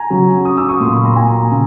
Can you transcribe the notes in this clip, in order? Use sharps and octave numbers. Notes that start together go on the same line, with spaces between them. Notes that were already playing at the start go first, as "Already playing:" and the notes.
Already playing: G#5 A#5
C#3 F#3
C#6 D#6
D6 E6
C#6 D#6
A#2 F#3 C6 D6
B5 C#6
A#5 C6
G#5 A#5
C#3